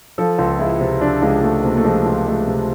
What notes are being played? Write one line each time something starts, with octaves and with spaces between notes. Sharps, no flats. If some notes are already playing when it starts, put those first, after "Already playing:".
F3 A4
C#2
G#3 E4
C3
F3 D4
C#2 G#3
G#3 A3
C3 A#3
A3
F3 G#3
C#2
G#3 A3
C3